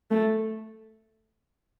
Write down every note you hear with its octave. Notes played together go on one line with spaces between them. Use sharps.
A3